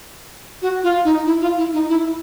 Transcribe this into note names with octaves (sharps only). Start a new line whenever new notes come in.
F#4
F4
D#4
E4
F4
E4
D#4
E4